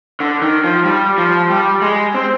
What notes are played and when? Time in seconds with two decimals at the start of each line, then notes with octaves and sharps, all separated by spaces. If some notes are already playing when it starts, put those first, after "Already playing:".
0.20 D3
0.42 D#3
0.64 F3
0.85 G3
1.18 F3
1.50 G3
1.82 G#3
2.15 C4